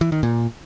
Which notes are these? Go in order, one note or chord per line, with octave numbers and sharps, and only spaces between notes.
E3
D#3
A#2